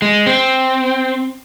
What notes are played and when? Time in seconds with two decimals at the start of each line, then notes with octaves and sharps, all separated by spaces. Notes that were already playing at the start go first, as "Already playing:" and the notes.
0.02 G#3
0.26 C4